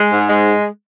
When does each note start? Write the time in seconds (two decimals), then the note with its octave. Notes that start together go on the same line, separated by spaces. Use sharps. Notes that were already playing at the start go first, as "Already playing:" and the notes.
Already playing: G#3
0.11 G#2
0.29 G#3